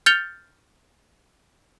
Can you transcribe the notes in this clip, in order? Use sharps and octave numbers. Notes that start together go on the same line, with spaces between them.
F6 G6 A6 C#7 F7 G7